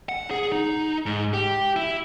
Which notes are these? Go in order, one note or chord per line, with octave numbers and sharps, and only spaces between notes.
F#5
G#4
D#4
G#2
G4
E4